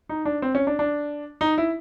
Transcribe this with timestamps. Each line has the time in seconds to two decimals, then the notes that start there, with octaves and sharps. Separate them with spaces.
0.09 D#4
0.25 D4
0.42 C4
0.55 C#4
0.67 D4
0.79 D4
1.41 D#4
1.58 E4